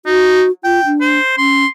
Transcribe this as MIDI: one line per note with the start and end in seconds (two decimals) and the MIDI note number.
0.05 0.44 63
0.05 0.51 66
0.64 0.84 65
0.64 0.91 79
0.85 1.19 62
1.01 1.37 72
1.37 1.65 61
1.37 1.68 84